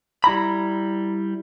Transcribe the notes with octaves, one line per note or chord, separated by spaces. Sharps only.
G3 E4 A#5 B5